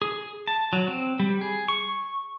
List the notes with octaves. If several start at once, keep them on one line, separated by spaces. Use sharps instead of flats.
G#4
A5
F#3
C4
G3
G#4
C#6